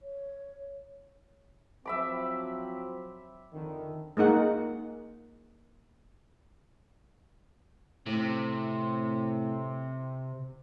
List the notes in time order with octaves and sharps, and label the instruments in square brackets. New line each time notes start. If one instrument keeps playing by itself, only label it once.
[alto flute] C#5
[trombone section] F3 F#3 C4 [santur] E5 B5 D6
[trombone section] F2 D3 D#3
[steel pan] G#3 A#3 D#4 F#5
[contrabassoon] A2 [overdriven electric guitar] C3 [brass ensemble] C4